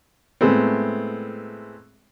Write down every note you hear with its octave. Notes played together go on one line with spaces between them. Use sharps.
A2 G#3 A3 B3 C4